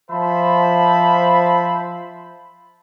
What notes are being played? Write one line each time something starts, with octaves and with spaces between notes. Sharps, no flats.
F3 C5 E5 A5 B5